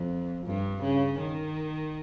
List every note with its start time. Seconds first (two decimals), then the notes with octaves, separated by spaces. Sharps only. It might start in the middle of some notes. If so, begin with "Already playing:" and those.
Already playing: F2
0.46 G2
0.83 C#3
1.19 D#3